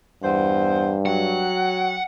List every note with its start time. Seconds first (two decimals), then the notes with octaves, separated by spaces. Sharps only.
0.23 E2 G2 C5 F#5 C6
1.06 F#3 F#5 G5